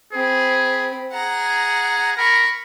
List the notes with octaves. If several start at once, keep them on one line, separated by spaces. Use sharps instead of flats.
C4 G#4 B5
G#4 F#5 A#5
A#4 B5 C#6